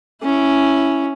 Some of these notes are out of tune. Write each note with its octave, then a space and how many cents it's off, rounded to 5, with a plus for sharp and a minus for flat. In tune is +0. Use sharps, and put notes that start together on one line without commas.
C#4 +0 E4 +0